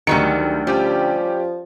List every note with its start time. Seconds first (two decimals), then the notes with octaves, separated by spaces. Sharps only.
0.07 D2 D#3 F#3 G3 D#4 C#7
0.67 F3 G3 C#4 G4 G5